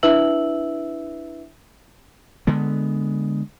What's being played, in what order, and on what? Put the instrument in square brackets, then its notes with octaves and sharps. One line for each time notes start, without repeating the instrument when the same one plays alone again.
[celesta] D4 E4 B4 E5 E6 F#7
[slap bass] D3 G#3 B3